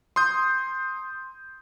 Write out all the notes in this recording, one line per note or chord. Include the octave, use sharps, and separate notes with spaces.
C6 D#6 G6